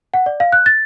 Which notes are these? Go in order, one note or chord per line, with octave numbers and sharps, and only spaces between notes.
F#5
D5
F5
F#6
A6